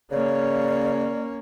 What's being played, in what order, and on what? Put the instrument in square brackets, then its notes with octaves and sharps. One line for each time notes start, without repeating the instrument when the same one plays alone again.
[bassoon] C#3 [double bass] A#3 C#4 [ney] D5